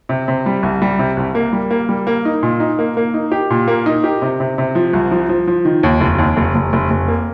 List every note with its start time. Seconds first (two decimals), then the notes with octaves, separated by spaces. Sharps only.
0.09 C3
0.28 C3
0.46 G3
0.63 C2
0.82 G3
0.99 C3
1.17 C2
1.35 A#3
1.53 G3
1.70 A#3
1.89 G3
2.07 A#3
2.25 D#4
2.43 A#2
2.60 D#4
2.79 A#3
2.97 A#3
3.14 D#4
3.32 G4
3.50 A#2
3.68 A#3
3.86 D#4
4.04 G4
4.22 C3
4.40 C3
4.58 C3
4.75 F3
4.93 C2
5.11 F3
5.29 F3
5.48 F3
5.65 D#3
5.83 D#2
6.01 F1
6.18 D#2
6.37 F1
6.55 F1
6.73 F1
6.90 F1
7.08 A#3